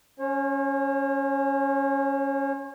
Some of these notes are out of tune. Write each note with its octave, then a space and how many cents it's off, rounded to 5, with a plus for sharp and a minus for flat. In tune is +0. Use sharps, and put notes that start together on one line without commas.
C#4 +0 C#5 -45